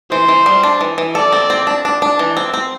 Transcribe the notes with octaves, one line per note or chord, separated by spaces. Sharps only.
E3 C5
E3
G3
D4
E3
E3
A4 D5
C4
C4
D4
D4
D4
E3
C4
C4